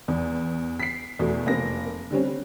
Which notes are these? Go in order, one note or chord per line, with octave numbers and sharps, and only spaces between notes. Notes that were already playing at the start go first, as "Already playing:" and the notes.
E2
B6 C7
E2 B2 A3
F1 A#3 C4 A#6
D3 G3 C4 C#4